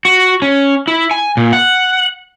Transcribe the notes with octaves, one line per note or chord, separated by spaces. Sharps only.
F#4
C#4
E4
G#5
A#2
F#5